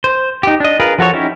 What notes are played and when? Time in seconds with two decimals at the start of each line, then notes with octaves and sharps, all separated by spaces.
0.04 C5
0.43 D#4 G4
0.60 D4 D#5
0.80 F4 G#4 A#4 B4
0.99 F3 F#4 A4 C#5
1.13 C#4 D#4 E4 G4